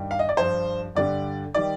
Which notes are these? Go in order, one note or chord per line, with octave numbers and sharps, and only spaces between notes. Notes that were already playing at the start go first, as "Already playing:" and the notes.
Already playing: G2 D#3 G3
F5
D#5
D5
G2 F3 C5
G2 D3 G3 D5
D#3 G3 D5